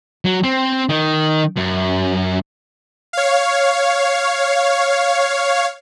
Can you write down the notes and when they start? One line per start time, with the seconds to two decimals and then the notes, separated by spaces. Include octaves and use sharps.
0.25 F#3
0.44 C4
0.89 D#3
1.57 F#2
3.13 C#5 F5